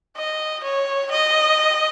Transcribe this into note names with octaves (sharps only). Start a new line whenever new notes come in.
D#5
C#5
D#5